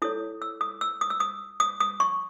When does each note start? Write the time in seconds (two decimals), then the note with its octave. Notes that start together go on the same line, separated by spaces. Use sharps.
0.02 E4 A4 C#5 D#6
0.42 E6
0.61 D#6
0.81 E6
1.01 D#6
1.10 E6
1.20 D#6
1.60 D#6
1.80 D#6
2.00 C#6